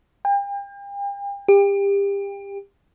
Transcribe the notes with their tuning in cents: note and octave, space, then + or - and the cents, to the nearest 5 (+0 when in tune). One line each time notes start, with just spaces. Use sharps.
G5 +40
G4 +30